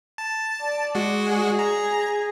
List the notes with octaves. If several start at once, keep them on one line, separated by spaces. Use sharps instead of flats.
A5
D5
G#3 F#4
G#4
A#5